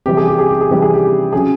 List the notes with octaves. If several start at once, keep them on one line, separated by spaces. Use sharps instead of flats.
C3 E3 G3 G4
G#4
G4
G#4
G4
G#4
C3 E3 G3 G4
G#4
G4
C#3 F#3 G#4